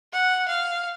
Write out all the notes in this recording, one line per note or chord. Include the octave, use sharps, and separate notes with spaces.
F#5
F5